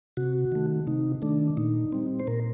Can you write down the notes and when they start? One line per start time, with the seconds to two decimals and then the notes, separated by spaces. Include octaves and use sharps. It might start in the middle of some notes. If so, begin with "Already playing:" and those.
0.17 C3 F#4
0.52 D#3 A3
0.87 C3 D#4
1.22 D#3 A3 D4
1.57 A#2 D#4
1.92 G3 C4
2.20 C5
2.27 A#2 A#4